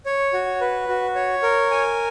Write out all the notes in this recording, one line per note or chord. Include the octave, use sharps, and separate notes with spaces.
C#5
F#4
B4
F#4
C#5
A#4
G#5